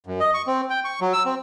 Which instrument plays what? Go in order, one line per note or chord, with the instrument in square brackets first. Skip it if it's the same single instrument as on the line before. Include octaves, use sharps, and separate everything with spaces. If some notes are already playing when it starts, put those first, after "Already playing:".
[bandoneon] F#2
D#5
C#6
C4
G5
C#6
F#3
E6
C4